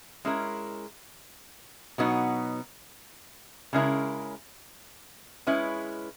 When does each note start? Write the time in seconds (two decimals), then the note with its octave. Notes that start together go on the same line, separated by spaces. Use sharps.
0.25 G#3 C#4 E4 A#4
1.98 B2 F#3 B3 D#4
3.73 C#3 G#3 C#4 E4 A#4
5.47 G#3 C#4 E4 B4